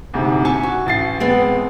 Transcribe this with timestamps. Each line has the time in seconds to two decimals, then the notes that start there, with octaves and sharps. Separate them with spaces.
0.14 D2 G#2 C3
0.45 E5 G#5 A5 C#6
0.63 F#4
0.86 A1 A6 C7
1.20 G#3 B3 C4